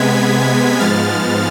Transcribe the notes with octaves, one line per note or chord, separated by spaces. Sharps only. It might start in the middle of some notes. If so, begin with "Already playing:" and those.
Already playing: C3 G#3 B3 G#6 B6
G#2 F3 G#3 B3 F6 A6